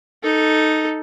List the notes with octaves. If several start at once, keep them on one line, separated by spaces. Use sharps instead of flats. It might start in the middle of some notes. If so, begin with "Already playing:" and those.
D#4 A4